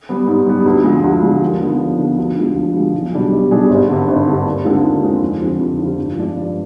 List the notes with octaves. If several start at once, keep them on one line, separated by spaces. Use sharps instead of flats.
G3 B3
G#2
G3 B3
D2
D3 F3 G#3
D2
D3 F3 G#3
D#2
D3 F3 B3
D#2
D3 F3 B3
D2
D3 F3 G#3
D2
D3 F3 G#3
B1
B2 G3 D4 G#4
B1
B2 G3 D4 G#4
G#1
G2 D3
G#1
G2 D3
D#2
D3 G#3 C4 F4
D#2
D3 G#3 C4 F4
F2
D3 F3 C4 F4
F2
D3 F3 C4 F4
G2
F3 G#3 D4
G2